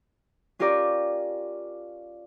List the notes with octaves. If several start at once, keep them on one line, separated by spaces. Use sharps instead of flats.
C#4 F4 G4 A#4 D5